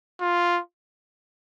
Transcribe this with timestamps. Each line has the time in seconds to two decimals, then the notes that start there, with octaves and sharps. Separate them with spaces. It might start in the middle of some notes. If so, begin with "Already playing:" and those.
0.21 F4